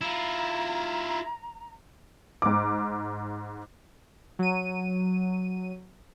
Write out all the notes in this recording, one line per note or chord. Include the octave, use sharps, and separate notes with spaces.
E4 F4 A#5
G#2 D6
F#3 D#7